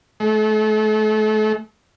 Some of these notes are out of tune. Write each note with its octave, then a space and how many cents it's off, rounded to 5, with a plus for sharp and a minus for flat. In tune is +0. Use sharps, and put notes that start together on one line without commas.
A3 -35